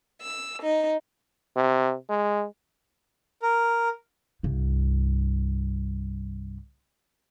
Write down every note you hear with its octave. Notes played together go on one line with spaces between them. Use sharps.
E6
D#4
C3
G#3
A#4
C2 G2